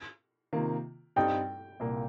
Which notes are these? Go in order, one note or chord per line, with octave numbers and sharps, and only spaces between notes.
C3 D#3 A#3 F4
G2 G3 C4 D#4 G5
C2 A#2 A#3